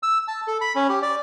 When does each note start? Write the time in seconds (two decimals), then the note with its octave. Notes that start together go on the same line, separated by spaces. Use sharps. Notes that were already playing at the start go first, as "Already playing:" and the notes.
0.03 E6
0.28 A5
0.47 A4
0.61 B5
0.75 C#4
0.89 G4
1.02 D5